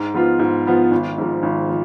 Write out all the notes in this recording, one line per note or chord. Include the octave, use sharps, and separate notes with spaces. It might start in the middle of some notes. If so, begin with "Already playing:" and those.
Already playing: G#2
F3 B3 F4
G#2
F3 B3 F4
G#1
G#2 F3
G#1
F3